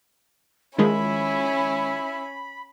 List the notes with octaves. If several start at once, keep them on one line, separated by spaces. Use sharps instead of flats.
D#3 F3 G#3 C#4 E4 B5